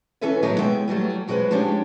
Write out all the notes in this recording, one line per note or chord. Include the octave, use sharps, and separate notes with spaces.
E3 C#4 A4 B4 E5 G#5
A2 D#3 F#3 B3 D#4 G4
G#3 B3 E5 G5
E3 F#3 G3 A3
F2 F#3 G#3 D4 B4 C5
F3 G#3 C#4 D4 G4